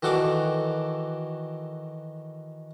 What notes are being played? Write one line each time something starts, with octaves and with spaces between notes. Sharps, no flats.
D#3 E3 F#4 A4 D5